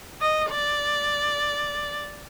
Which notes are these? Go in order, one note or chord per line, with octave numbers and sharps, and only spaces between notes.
D#5
D5